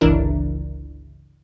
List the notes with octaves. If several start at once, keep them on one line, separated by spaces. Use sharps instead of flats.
G1 C#2 E3 D4 E4 A#4